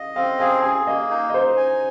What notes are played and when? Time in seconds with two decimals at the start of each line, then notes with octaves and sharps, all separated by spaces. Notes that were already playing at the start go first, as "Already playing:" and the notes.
Already playing: D#5 F5
0.16 C4 F5
0.39 G#4 F5
0.62 G#4 G#5
0.86 A#3 D#5
1.10 D#4
1.29 D#5
1.34 D#4 C5
1.57 G#5